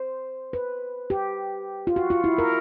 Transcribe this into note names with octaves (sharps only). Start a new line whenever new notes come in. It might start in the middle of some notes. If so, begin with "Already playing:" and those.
Already playing: C5
B4
G4
F4
F#4
F4
E4
A#4